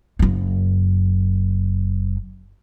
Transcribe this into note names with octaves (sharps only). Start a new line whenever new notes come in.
F#1 F#2